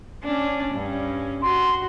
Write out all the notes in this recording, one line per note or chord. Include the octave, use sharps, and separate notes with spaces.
C#4 D4
G2 C#4
F#4 C6